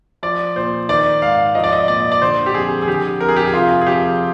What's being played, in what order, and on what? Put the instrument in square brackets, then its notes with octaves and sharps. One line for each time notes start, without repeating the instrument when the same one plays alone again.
[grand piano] F3 D5
A#2 C5
D#3 D5
G#2 F5
F3 D#5
D5
D#5
A#2 D5
D5
D3 C5
G4
F2 G#4
G#4
D3 G4
F2 A#4
G#4
G4
G#4
C3 F4
G#4
F2 G4